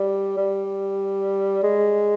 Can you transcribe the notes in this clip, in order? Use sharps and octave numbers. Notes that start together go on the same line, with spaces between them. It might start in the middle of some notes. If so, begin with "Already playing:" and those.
Already playing: G3
G3
G#3